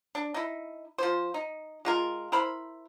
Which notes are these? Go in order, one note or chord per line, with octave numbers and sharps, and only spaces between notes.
D4
D#4 E4
F3 C5
D#4
G#3 F4 A#4
E4 A#4 C5 B5